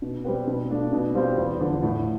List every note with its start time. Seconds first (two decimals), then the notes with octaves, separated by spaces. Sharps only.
0.02 B2
0.24 G3 C4 G4 B4
0.47 B2
0.70 A3 D4 F4
0.93 B2
1.15 G3 C4 F4 C5
1.38 E2
1.60 D3 F3
1.83 A2